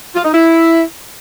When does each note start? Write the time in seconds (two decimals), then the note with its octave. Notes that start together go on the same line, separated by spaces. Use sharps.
0.15 F4
0.24 D#4
0.33 E4